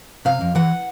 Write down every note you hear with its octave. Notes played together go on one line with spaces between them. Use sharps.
C3 F5
F2
E3 F#5